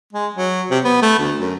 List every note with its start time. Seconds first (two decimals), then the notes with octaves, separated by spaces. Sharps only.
0.13 G#3
0.34 F#3
0.70 C3
0.84 B3
1.02 A3
1.19 D2
1.38 F#2